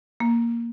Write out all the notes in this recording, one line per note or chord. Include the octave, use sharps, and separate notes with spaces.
A#3